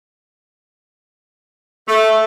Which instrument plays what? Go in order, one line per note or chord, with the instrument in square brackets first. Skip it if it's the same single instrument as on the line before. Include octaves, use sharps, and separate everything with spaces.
[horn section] A3